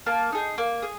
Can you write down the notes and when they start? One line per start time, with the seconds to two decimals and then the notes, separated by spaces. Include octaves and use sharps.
0.06 A#3 A5
0.33 D#4 G#4
0.58 A#3
0.83 G#4